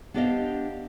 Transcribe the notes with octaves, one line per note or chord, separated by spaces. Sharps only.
B3 D4 G4 C5 D#5 F5